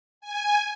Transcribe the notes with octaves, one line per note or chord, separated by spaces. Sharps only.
G#5